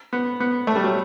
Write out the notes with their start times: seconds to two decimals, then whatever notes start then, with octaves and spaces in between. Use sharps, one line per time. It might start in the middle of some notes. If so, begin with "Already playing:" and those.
0.13 B3
0.40 B3
0.67 A3
0.76 G3
0.83 F#3